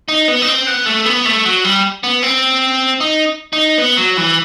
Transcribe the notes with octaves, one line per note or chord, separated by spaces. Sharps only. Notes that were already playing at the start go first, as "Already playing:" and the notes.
D#4
B3
D#4
C4
B3
A3
B3
A3
F#3
G3
B3
C4
D#4
D#4
B3
F#3
E3